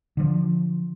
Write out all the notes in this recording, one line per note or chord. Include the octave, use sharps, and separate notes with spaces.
D3 F3